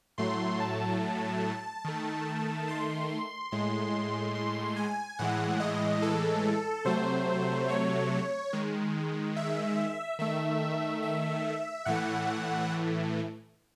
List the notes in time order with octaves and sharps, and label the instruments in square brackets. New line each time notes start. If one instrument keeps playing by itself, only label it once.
[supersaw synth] A2 F#3 A3 C6
A5
D#3 A3
C6
A2 G#3 C6
C6
G#5
A2 E3 G#3 F#5
D#5
A4
C3 F#3 A3 C5
C#5
D#3 G#3
E5
D#3 A3 E5
E5
A2 E3 A3 F#5